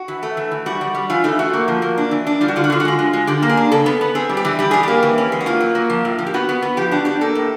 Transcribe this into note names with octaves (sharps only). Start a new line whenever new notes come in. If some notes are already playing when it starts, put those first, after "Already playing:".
Already playing: F#4
E3
A3
E3
E3
G3 F#4
G3
G3
E3 F4
A3 D#4
A3 F#4
A#3
F3
A#3
D4
E3
D4
G3 F4
F#4
D3 F4
F#4
D3 F4
F#4
G#3 F4
G#3
G#3
D3 G4
A#3
G#4
D4
C#3 A4
B3
B3
C4 G#4
G3
G4
E3
G3 G4
G3 G#4
A#3 G4
E3
C#4
G#3
F#4
A#3 F4
F#3
A#3
F3
A2
F3
G4
B3 F#4
B3
B3
F3 G4
D4 F#4
D4 G4
A#3 A4
A2